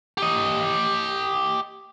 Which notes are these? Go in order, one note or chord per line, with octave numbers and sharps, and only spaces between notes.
G4 D#5